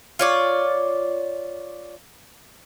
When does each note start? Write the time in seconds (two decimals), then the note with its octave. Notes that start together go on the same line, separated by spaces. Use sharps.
0.19 F4 C#5 D5